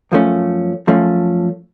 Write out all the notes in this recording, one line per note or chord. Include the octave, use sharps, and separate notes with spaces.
F#2 F3 A3 C#4
F#2 F3 A3 C#4